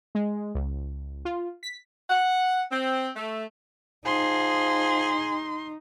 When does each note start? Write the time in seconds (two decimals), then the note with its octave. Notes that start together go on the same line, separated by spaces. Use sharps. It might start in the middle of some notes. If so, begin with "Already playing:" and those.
0.15 G#3
0.55 C#2
1.25 F4
1.63 B6
2.10 F#5
2.71 C4
3.16 A3
4.06 F3 D#4 G#4 C6